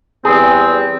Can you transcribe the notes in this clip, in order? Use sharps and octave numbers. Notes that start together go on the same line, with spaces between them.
E2 G3 C4 G#4 B4